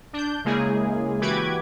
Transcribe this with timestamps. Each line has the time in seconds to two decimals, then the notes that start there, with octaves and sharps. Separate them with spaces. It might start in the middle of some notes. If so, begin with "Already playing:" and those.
0.13 D4 G6
0.45 C#3 G#3 A#3 E4 G#4
1.21 E3 F#4 G4 B4 D6 G#6